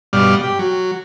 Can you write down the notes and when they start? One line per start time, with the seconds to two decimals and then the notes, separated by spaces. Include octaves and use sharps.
0.13 G2 B2 G3 D5 F5
0.43 G4
0.59 F#3